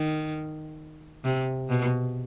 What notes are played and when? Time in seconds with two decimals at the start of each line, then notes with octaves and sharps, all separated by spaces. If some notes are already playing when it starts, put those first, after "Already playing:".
Already playing: D#3
1.24 C3
1.69 B2